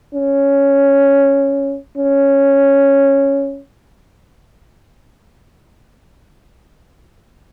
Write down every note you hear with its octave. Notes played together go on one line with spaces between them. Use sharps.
C#4
C#4